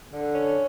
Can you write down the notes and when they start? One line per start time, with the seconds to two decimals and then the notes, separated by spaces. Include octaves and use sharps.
0.11 D3
0.35 C#4